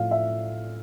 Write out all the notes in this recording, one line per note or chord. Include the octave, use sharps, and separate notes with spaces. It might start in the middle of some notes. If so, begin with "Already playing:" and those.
Already playing: A2 F3 A3 F5
E5